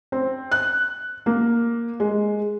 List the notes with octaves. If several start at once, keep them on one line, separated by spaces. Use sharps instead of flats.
C4
F#6
A#3
G#3